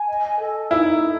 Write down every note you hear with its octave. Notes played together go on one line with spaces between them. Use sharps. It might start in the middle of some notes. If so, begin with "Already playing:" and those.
Already playing: G#5
D#5
A4
D#4 E4
A4